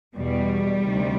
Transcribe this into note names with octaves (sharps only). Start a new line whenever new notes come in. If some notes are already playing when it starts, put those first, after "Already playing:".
E2 B2 G3
D2 C3 D#3